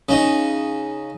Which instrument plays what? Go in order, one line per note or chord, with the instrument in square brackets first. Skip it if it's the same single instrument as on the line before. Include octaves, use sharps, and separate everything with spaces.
[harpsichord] C#3 D#4